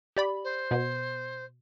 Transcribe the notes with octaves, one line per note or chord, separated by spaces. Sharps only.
G4 D5 B5
C5
B2 B3